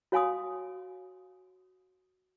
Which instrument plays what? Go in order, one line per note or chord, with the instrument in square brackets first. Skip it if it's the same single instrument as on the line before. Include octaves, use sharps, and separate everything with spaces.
[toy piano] F#4 C#5 F5 G#5 C6 D#6